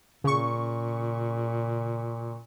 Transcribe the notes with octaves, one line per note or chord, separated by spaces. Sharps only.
A#2 C#3 C#6